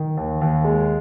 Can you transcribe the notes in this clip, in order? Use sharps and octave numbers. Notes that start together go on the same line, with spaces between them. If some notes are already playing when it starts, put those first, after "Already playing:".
Already playing: D#3
D#2
D#2
G#3